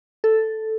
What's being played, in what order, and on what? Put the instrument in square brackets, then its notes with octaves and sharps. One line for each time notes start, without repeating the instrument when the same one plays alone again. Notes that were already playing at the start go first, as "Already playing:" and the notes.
[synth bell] A4